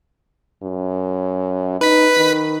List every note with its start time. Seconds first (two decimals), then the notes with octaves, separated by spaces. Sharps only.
0.63 F#2
1.81 D#4 B4 B6
2.17 D#3